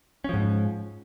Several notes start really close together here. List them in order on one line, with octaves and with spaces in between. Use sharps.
C#4 F3 G#2